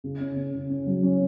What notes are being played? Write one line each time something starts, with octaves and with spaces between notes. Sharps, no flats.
C#3
C#4
C#4
C#3
C#4
F#3
C#4